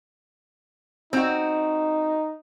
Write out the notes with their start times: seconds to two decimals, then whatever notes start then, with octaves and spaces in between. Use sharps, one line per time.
1.13 C4 D#4 F#4